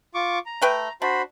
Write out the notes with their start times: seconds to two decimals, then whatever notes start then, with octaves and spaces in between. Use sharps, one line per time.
0.15 F4 C#6 D6
0.46 A#5
0.62 A3 B4 G5
1.02 D4 F#4 C5 B5